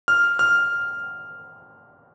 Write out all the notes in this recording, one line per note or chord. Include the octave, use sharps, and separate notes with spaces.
F6
F6